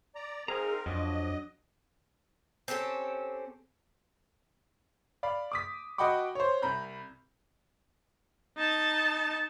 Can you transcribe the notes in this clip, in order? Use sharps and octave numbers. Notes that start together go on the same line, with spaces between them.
D5 A#5
C4 D#4 G#4 A#4 F5 A#5
F2 F#3 D4 D#5
C4 C#4 G4 A4
D5 F5 B5
D6 D#6 B6
F#4 D#5 F#5 G5 B5 D6
C5 C#5
C2 A#5 B5 G6
D#4 A5